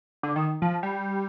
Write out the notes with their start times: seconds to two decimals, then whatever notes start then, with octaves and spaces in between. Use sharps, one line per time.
0.23 D3
0.36 D#3
0.62 F3
0.83 G3